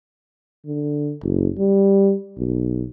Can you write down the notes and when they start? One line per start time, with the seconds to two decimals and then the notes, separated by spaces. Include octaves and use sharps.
0.65 D3
1.22 F#1
1.59 G3
2.38 B1